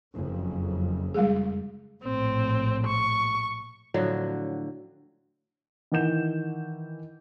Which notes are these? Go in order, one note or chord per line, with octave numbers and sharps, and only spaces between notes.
F#1 F2
G3 G#3 G#4
A#1 A2 C4
C#6
A2 D3 F3 F#3
D#3 E3 F#5 G6 E7